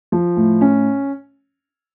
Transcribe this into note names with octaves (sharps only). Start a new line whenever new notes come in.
F3
A2
C#4